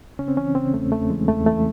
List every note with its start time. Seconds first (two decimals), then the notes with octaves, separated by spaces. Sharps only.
0.19 C#3 C#4
0.28 C4
0.37 E3 C#4
0.55 C#3 C4
0.74 E2 A3
0.92 E2 A3
1.10 E3 G#3
1.28 E2 A3
1.46 E3 A3